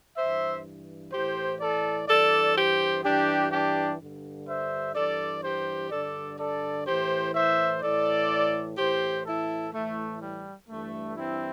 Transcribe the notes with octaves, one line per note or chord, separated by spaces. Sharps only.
G2 E3 C5 E5
A2 E3 G4 C5
A4 D5
G2 E3 A4 D5
G4 C5
G2 E3 D4 G4
D4 G4
G2 D3
C5 E5
G2 E3 A4 D5
G4 C5
G2 D3 A4 D5
A4 D5
A2 E3 G4 C5
C5 E5
A2 E3 A4 D5
A2 E3 G4 C5
E4 A4
A2 E3 A3
G3
G2 E3 A3
C4 E4